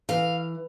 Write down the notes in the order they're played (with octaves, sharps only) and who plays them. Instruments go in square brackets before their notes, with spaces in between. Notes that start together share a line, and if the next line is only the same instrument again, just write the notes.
[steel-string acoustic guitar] E3 F5